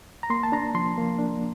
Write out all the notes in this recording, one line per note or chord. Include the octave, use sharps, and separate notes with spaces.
A#5
A#3 C6
A5
D4 A#5
F3 C6
A#3
D4